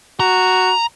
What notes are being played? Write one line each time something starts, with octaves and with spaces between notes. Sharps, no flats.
F#4 A#5